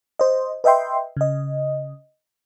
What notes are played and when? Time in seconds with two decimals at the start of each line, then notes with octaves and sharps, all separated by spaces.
0.19 C5 D#5
0.64 B4 D#5 E5 G5 C6
1.17 C#3 D#5